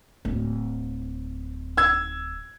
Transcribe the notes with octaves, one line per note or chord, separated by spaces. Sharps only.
D1 D4
E6 G#6